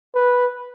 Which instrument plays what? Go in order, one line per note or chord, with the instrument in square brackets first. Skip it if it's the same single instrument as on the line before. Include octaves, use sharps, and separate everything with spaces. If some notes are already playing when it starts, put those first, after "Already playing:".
[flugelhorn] B4